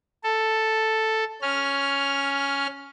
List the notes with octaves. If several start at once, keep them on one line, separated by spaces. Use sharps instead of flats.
A4
C#4 F6